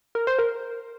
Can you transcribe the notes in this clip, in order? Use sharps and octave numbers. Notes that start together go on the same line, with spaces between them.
A#4
C5
A#4